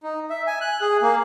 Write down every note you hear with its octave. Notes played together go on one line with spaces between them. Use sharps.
D#4
E5
G#5
F#6
G#4
A#3